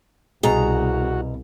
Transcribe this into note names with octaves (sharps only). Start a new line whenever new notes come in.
C2 B2 F#4 G#4 A#5